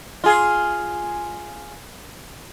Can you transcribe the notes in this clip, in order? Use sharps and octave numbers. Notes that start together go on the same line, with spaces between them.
F4 G#4